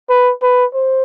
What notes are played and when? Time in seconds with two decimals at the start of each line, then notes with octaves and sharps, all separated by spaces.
0.09 B4
0.42 B4
0.74 C5